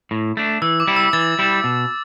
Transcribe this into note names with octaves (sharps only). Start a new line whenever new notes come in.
A2
A3 D4
E3 E6
D6
G3 E4
E6
E3 A6
G3 E4
B2